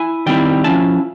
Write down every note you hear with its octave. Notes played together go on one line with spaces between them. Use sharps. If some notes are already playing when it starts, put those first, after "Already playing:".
Already playing: E4 G#5
D#3 G3 C4 E4 G5
F3 G#3 C#4 E4 A5